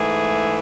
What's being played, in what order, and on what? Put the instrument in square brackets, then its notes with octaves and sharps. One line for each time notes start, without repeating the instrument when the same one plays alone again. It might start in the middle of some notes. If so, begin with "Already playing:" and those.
Already playing: [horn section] G#2 E3 A3 G#4